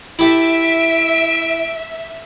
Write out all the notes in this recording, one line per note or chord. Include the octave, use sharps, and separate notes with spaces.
E4 G4 A4 E5 D7